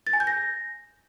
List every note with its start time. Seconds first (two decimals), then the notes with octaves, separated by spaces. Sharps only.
0.07 A6
0.13 G#5
0.20 G6
0.27 A#6